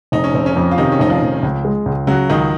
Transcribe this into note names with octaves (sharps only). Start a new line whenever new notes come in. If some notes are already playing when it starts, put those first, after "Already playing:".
F1 D#4
C#4
F1 C4
C#3 C#4
F2
F4
C3 D#3 D#4
C#4
F1 D#4
F3 F4
F1
C#2
G#3
C#2
C#3 F#3 F#4
C#2 D#3 D#4